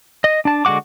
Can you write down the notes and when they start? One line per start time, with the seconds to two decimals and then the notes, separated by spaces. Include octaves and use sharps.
0.24 D#5
0.45 D4 A5
0.65 D3 G#3 F#4 F#5 D6